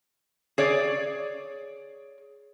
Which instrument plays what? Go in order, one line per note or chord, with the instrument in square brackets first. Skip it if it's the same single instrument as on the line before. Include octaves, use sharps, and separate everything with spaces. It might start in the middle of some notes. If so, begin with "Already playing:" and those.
[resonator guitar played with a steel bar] G#4 C#5 D5